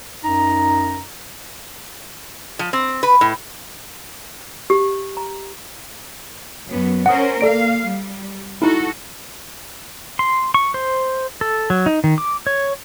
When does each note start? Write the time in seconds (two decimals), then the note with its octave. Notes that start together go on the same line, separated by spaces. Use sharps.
0.24 F#2 D#4 A#5
2.59 F3
2.73 C4
3.03 B4
3.21 A2
4.70 G4
5.17 A#5
6.66 F#2 B3
7.06 C#4 A#4 C5 F#5 D#6
7.41 A#3 A4 D5 F5 D7
7.84 G3
8.62 D#4 E4 F#4 A4
10.19 C6
10.54 C#6
10.74 C5
11.41 A4
11.70 F#3
11.86 D#4
12.04 D#3
12.18 D6
12.47 C#5